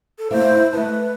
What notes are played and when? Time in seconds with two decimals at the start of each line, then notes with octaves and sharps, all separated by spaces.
0.19 A4
0.31 A3 A#3 E4 C5
0.52 E4 D#5
0.73 A3 B4 D#5 A5